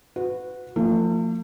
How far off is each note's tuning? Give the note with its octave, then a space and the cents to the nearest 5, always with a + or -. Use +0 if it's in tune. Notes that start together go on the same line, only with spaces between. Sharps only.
F#4 -15 B4 +25
F3 +0 A3 +45